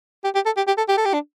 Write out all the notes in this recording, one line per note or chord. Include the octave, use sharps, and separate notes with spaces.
G4
G4
A4
G4
G4
A4
G4
A4
G4
D4